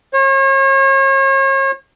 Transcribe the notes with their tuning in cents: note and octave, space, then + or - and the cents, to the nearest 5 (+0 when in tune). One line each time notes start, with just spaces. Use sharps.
C#5 -40